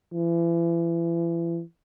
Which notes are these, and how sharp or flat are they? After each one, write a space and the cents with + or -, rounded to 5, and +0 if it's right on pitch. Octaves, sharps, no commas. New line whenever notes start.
E3 +35